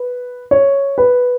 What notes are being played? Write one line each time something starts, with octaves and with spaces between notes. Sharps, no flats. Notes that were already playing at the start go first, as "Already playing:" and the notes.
Already playing: B4
C#5
B4